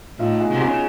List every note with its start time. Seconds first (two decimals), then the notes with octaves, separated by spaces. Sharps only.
0.19 A2 D#4 F4
0.40 F#4 G#4
0.51 C#3
0.61 F#4 G#4